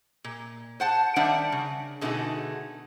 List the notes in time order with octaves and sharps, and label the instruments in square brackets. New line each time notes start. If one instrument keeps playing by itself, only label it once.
[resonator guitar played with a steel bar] A#2
C5 F#5 A5
D#3 G3 D4 D5 E5 F#5
C#3
B2 D3 A3 D#4 F#4 G#4